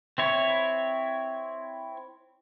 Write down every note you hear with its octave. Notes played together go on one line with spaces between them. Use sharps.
C4 E4 C#5